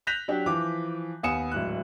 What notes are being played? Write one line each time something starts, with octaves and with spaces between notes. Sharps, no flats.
F#6 G6 A#6 B6 F7
F#3 D4 G4
E3 F3 D6
D#2 B3 G#5 D#6 C#7 E7
D1 G#1 F#6